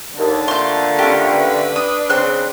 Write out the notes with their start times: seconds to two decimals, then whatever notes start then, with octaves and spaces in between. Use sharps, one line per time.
0.18 D#2 D3 A5
0.48 A3 A#3 F4 C6 G6
0.99 C#4 G4
1.31 B4
1.76 D4 D#6
2.10 C#3 C4 C6 F#6